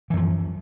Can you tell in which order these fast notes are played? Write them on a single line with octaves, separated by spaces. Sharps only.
E3 F#2 F3